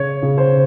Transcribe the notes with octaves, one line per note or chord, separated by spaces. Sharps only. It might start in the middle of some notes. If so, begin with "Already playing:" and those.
Already playing: C#3 C#5
C#3
C5